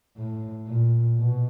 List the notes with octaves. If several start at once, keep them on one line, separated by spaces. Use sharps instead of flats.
A2
A#2
B2